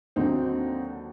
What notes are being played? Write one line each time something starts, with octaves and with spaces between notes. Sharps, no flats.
D#2 D3 F#3 C4 D#4